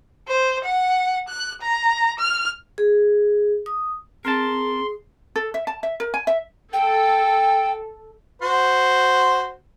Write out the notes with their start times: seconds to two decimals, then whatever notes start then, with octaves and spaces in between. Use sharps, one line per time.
0.28 C5
0.64 F#5
1.28 F#6
1.61 A#5
2.19 F6
2.78 G#4
3.66 D#6
4.25 C4 G#4 A#4 A5 C6
5.36 A4
5.54 E5
5.67 A5
5.83 E5
6.00 A#4
6.14 G#5
6.27 E5
6.73 A4 G5
8.42 F#4 C5